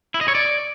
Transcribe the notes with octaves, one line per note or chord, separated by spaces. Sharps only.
E4
D#5
C#5
D5